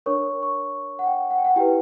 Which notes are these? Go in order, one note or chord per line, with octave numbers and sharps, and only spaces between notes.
D4 A#4 C#5 C#6
C#6
F#5
G5
F#5
G5
F#5
E4 G4 B4 G5